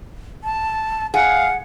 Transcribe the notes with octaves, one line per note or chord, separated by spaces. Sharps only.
A5
G#4 F5 F#5